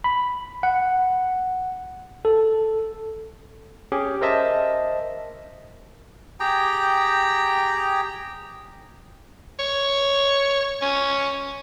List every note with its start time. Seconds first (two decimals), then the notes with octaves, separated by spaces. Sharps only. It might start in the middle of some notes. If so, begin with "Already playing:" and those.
0.04 B5
0.63 F#5
2.25 A4
3.92 C#4 G4 G#4
4.21 A#4 C5 D#5 E5 A5
6.40 G4 G#4 G5 A#5
9.59 C#5
10.82 C#4